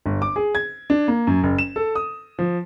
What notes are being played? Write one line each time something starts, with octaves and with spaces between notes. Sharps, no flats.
G1
D6
G#4
G#6
D4
A#3
F#2
F#1
E7
A4
D#6
F3